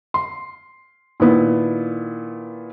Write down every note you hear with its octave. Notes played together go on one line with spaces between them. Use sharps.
C6
A#2 D#3 B3 E4